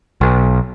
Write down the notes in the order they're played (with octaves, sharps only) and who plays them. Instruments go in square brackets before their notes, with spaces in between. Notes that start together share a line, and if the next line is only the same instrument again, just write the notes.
[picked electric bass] B1